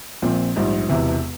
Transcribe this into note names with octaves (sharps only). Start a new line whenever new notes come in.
A#1 A#2 F3 C4
A#1 G#2 G3
E1 E2 C3 E3